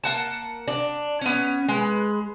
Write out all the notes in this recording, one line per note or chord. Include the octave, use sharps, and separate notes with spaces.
A#3 F#5 A5
D4
B3 C#4
G#3 B4